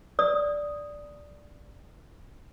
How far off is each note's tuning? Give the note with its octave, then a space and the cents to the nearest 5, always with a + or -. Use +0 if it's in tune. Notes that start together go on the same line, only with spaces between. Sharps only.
D5 +0 D#6 +0